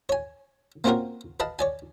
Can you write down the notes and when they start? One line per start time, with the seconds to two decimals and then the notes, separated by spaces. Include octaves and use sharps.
0.09 C#5 G#5
0.84 A#3 C4 C#4 F4 F#4 A#4
1.40 B4 D#5 F5 A5
1.59 C#5 D5 G#5